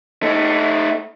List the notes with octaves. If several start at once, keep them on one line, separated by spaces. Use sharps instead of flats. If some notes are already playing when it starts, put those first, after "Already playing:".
A3 D#4